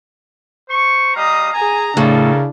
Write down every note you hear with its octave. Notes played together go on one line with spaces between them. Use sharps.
C5 C#6
G3 D#5 F5 A#5 D#6
G#4 G#5 A#5
A2 C#3 D4 A4 A#4